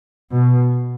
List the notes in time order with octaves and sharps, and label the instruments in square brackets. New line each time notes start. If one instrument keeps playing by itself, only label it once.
[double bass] B2